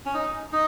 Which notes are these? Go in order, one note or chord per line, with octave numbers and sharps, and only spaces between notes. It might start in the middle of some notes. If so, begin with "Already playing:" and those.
C#4
D#4
D#4